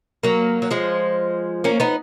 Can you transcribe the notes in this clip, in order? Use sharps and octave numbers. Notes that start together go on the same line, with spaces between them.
F#3 A#3
F#3
F3 G#3
A#3 C#4
B3 D#4